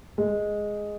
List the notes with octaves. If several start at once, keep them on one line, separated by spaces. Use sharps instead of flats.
G#3